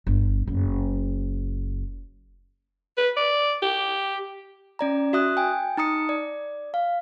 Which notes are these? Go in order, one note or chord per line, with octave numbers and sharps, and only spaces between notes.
G1
F#1
B4
D5
G4
C#4 D5 A#5
F#4 E5 D#6 F#6
G5 G#5
D#4 A#5 D#6 C#7
D5
F5